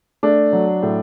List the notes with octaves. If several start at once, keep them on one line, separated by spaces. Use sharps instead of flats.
A3 D4
F#3
A2